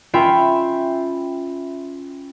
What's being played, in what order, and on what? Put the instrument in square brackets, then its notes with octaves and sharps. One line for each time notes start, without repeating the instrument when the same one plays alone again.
[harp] C#4 F4 E5 G5 B5